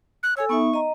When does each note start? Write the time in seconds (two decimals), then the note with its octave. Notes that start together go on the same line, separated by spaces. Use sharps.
0.23 F#6
0.37 A4 C#5 G#5 E6
0.49 B3 D#4 E5 C#6
0.73 D#5 A#5